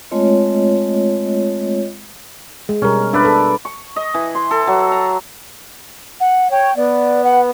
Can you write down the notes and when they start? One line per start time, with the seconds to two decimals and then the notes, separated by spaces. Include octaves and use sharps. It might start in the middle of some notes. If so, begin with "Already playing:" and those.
0.11 G#3 A3 C4 F4 C#5 D#5
2.69 G#3
2.82 B2 G3 C#4 A#4
3.13 D4 B4 D5 E5
3.25 A4
3.65 C#6
3.96 D#5
4.14 E3
4.35 C6
4.51 A4
4.67 F#3
4.92 A#5
6.20 F#5
6.51 C#5 G5
6.77 B3 D5
7.24 F#5